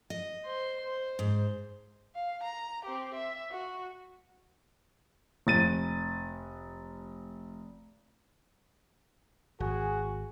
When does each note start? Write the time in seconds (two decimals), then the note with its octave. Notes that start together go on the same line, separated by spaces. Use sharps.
0.10 D#5
0.46 C5 C6
0.85 C5
1.19 G#2
2.15 F5
2.43 A#5
2.85 C4 G4
3.14 E5
3.51 F#4
5.47 F1 A6 D#7
9.60 G#1 F#4 G#4